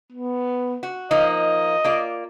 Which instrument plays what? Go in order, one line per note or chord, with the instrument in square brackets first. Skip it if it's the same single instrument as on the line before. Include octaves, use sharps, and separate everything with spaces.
[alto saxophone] B3
[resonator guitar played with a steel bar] F#4
[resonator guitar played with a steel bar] F3 A#3 D#4 [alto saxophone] D#5
[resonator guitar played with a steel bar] A#3 F4 D5